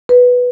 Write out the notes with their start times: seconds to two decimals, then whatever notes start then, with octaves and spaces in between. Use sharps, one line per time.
0.09 B4